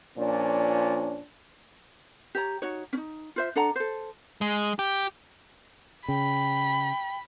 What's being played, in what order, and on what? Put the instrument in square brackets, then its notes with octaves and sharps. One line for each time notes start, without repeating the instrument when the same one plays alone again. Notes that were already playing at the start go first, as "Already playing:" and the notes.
[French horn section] A#2 F3 C#4 D4
[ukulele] G4 C#5 A#5
D#4 F#4 C#5
C#4 D#4
F4 C5 E5
D4 A4 F#5 A#5
A4 C5
[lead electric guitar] G#3
G4
[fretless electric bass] C#3 [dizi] G5 [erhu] B5